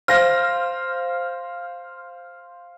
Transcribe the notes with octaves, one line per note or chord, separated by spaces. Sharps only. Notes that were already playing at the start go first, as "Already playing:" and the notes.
C5 F5 F6 A#6